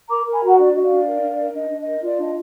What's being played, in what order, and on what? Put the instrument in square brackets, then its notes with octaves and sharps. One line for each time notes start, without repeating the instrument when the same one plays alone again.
[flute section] A#4 A#5 D6
A#4
G#5 B5
F#4 F#5 A#5
D4 D5
F#4 D#5
D5 F5
D4
A#4
D4
A#4
D4 D#5
D4
D#5
A#4
F4 D5
D4 D#5